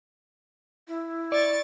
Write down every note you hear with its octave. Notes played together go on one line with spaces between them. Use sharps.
E4
D5 C#6 A6